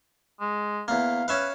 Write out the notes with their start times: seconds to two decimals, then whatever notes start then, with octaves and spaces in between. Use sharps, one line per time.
0.40 G#3
0.88 E2 A#3 F5
1.28 C#4 B4 E5 F5